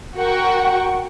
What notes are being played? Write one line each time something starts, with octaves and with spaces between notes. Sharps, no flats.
F#4 A#4 F#5 G5 C#6